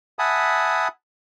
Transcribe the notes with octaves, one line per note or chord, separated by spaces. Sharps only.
E5 F#5 G#5 A5 B5 D#6